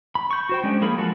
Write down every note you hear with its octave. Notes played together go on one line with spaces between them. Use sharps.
B5
C#6 G6
F#4 C5 G5
G#3 C#4 D4
F3 A#3 G#4 A#4 B5
F3 F#3 G#3 F#4 A4